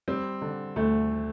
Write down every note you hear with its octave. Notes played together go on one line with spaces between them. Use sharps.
G3 C4
D3
D2 A3